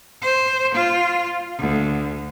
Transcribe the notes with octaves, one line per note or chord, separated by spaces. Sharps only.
C5
F4
D2